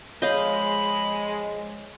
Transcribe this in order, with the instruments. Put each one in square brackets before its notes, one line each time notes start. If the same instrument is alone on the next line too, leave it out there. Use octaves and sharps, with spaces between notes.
[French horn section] F3 G#3 [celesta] C#5 G6 G7 [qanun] D#5 F5 [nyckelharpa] B5